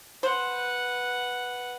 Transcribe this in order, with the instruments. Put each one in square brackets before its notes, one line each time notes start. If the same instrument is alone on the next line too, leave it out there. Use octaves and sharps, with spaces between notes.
[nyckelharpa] B4 F#5 [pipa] C5